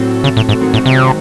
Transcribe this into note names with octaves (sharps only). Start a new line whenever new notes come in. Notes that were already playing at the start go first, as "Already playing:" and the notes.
Already playing: A2 F#3 C4 F#4 A4
C#3
A2
G#2
G#2 D#3 F#3 C4 F#4
A2
C3